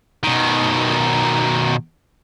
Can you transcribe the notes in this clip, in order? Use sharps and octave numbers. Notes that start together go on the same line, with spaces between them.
B2 D#3